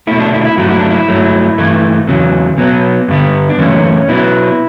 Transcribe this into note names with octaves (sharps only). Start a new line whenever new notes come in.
B2 A3 E4
D4
E4
D4
E4
G2 F#3 A3 F#4
E4
D4
E4
G2 F#3 A3
G2 E3 A3
E2 C#3 F#3
B2 F#3 B3
G2 D3 G3 B3
D4
F#2 C#3 E3 A3 C#4
B2 F#3 B3 E4